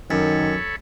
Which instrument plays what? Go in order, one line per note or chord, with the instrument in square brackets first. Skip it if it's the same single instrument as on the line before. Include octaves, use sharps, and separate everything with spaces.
[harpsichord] F#2 [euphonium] D#3 [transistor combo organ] A4 C#5 B5